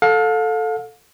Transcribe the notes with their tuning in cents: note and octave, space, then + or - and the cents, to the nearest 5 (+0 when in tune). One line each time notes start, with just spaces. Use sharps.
A4 +0 F5 +35